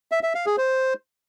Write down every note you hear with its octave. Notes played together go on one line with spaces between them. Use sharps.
E5
E5
F5
G#4
C5